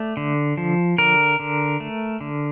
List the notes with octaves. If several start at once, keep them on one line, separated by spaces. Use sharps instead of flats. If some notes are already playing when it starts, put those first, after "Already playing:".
Already playing: A3 D5
D3
F3
D3 A#4
D3
A3
D3